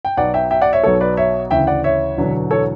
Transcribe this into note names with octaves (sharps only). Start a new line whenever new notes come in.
G5
B1 B2 F#3 D5 F#5
E5 G5
E5 G5
D5 F#5
C#5 E5
B1 B2 F#3 A4 C#5
B4 D5
C#5 E5
D2 C#3 E3 E5 G5
D5 F#5
C#5 E5
E1 E2 D3 F#3
A4 C#5